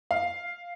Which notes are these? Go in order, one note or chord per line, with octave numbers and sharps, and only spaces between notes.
F5